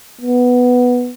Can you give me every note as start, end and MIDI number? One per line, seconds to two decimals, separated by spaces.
0.21 1.12 59